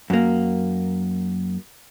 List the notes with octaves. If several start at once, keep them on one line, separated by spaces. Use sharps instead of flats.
F#2 A#3